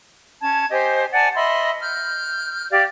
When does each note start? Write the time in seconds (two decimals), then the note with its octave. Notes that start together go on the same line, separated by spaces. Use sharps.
0.41 C#4 A5 G#6
0.70 G4 C5 D#5 G#5
1.13 D5 F#5 G#5 A5
1.34 D#5 E5 B5 C6
1.80 F6 G6
2.71 G4 D5 F5